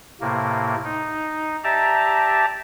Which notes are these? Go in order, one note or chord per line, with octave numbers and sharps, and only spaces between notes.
A2 C3 A#3
D#4
G4 D5 E5 A5 A#5